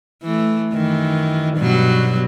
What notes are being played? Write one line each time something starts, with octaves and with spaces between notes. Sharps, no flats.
E3 A3
F#2 D#3 E3
G2 B2 F#3